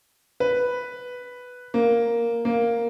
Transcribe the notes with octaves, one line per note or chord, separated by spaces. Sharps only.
B4
A#3
A#3